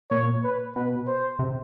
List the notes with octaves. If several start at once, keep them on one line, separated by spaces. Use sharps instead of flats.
A#2 C#5
B4
B2 B4
C5
C3